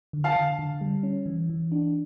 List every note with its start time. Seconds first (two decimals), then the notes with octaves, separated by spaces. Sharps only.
0.13 D3
0.24 F5 A5
0.36 D3
0.59 D3
0.81 G3
1.03 C#4
1.26 E3
1.50 E3
1.72 D4